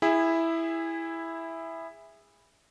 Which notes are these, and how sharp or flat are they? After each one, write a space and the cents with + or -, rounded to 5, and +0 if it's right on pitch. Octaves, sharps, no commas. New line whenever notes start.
E4 +0 G#4 -25 E5 +0